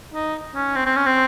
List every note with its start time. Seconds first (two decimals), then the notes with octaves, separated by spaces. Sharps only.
0.14 D#4
0.55 C#4
0.75 C4
0.85 C4
0.96 C#4
1.06 C4